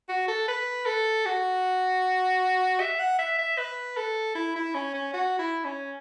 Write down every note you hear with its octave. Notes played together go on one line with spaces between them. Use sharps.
F#4
A4
B4
A4
F#4
E5
F#5
E5
E5
B4
A4
E4
E4
C#4
C#4
F#4
E4
C#4